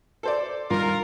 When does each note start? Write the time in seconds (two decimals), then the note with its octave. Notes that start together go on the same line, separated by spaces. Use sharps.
0.23 A4 C5 D5
0.70 G2 D#3 F4 A#4